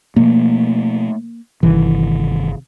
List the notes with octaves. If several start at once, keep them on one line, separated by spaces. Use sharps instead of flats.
B2 F3 A3 A#3
G1 C3 D#3 E3